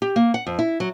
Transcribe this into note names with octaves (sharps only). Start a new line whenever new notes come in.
G4
A#3
F#5
F2
E4
F#3